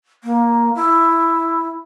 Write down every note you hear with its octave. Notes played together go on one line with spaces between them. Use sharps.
A#3
E4